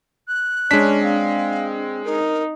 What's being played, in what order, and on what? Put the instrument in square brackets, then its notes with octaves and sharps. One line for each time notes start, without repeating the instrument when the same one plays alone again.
[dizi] F#6
[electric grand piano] G#3 B6 [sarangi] C#4 [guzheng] D4
[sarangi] C4 [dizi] F5
[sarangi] D#4 [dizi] A#4